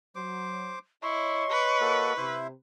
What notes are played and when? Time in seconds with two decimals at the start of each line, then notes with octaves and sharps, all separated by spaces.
0.15 F#3 C5 D6
1.03 E4 C#5 D#5 C6 C#6
1.50 B4
1.81 A#3 F#4 A4
2.17 C3 E4 C5 E5